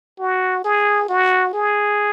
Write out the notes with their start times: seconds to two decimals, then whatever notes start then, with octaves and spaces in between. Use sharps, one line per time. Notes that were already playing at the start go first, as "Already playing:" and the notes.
0.19 F#4
0.64 G#4
1.08 F#4
1.53 G#4